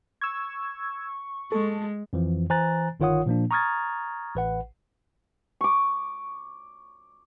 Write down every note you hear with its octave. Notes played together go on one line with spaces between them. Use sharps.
C#6 E6 G#6
G#3 A4
F2 E3 F3
E3 C5 G#5 A#5 F#6 A6
G1 D#3 F4 C#5 F#5 D#6
A#2 F3 A#3 D4
A#5 C#6 D#6 F6 G#6 A6
A1 B4 F#5
C#6 D6